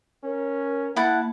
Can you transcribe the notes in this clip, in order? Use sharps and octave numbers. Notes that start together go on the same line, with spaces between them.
C#4 A#4
A#3 E4 F#5 A5